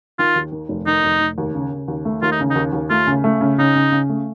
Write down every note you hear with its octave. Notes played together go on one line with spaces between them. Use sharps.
D#3 F4
D#2
D#3
F1
D#3 D#4
F1
F1
D#2
C#3
C#3
D#2
A3
D#2 F4
D#4
C#3
D#4
D#2
D#2
A3 F4
C#3
A3
C#3
C#3 D#4
C#3
C#3
A3